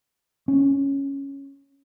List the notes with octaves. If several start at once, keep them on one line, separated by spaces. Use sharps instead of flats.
C#4